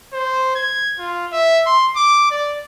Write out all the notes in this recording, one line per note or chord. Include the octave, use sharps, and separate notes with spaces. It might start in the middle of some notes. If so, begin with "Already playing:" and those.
C5
G#6
F4
E5
C6
D6
D5